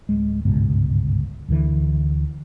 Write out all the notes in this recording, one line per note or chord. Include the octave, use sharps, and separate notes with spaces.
D1 G#3
G1 C#2 G#2 B2
D2 D3 E3